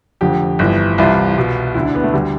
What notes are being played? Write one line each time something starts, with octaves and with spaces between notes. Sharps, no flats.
F1 F2 D3 G4
G1 F2 E3
C2 C3 E3 F4
C2 B2
D2 D3 E4
D4
B3
A3
D2 D3 G3